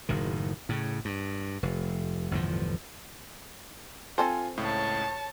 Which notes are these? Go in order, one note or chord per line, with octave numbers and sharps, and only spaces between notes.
F#1 A2 D#3
A2 C#3
G2
F1
G1 E2 A2 F3
C4 F4 A4 C5 G#5
C#2 A2 C#5 A5